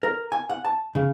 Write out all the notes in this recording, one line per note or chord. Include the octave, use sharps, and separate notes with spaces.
A#4
G#5
F#5
A5
C#3